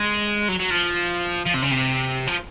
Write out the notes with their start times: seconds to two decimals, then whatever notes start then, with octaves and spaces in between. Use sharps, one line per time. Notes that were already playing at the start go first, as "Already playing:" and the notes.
Already playing: G#3
0.49 F#3
0.60 F#3
0.71 F3
1.46 F3
1.54 C3
1.63 C#3
1.71 C3
2.27 F3